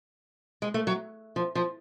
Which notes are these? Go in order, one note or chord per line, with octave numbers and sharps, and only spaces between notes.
G#3
A3
F#3
F3
F3